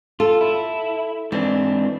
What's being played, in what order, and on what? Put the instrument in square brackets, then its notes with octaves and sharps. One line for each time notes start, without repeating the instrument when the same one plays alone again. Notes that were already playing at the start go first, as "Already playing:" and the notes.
[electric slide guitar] F4 [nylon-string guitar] A4
[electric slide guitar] E4
[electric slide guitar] G#2 C4 D4 [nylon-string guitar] E3